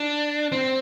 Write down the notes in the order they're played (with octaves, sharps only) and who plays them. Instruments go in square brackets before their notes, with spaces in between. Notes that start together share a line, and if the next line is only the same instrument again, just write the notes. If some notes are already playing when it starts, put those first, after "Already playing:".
Already playing: [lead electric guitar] D4
C4